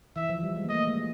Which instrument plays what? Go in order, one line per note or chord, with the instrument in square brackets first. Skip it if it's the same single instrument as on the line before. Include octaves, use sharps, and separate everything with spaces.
[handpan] E3 [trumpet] E5
[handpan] F3
G3
G#3
A#3
[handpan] A3 [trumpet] D#5
[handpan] G#3